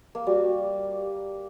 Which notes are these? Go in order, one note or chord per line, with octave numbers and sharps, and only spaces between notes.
A#3
G3 F#4